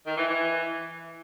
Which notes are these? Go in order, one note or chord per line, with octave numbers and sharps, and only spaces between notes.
D#3
E3
E3